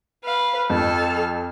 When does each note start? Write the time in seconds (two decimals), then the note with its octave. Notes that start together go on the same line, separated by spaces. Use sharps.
0.24 B4 F5
0.70 F2 A4 A5 F6